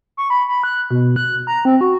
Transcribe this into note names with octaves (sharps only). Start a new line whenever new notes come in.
C#6
B5
B5
F#6
B2
F#6
A#5
C4
F#4